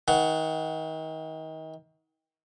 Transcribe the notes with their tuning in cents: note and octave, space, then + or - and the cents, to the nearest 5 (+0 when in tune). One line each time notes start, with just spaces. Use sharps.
D#3 +35 F#5 +0